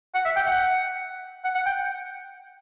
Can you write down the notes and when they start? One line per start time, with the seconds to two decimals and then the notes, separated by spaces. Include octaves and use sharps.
0.15 F#5
0.25 E5
0.36 G5
0.47 F#5
1.44 F#5
1.55 F#5
1.66 G5